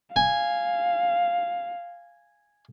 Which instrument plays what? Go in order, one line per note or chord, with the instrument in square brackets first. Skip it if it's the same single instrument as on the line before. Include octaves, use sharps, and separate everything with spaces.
[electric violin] F5 [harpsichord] G#5